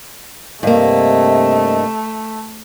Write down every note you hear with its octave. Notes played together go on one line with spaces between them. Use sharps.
G2 C3 A3 A#3 D#5